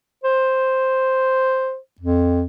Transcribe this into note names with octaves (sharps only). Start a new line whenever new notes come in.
C5
F2